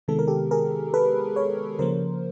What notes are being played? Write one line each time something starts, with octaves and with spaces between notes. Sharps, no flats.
C3 D#3 G#3 B3 A4
A#4
G4 A4
G#4 A#4
A4 B4
B4 C#5
C#3 F3 A#3 A#4 C5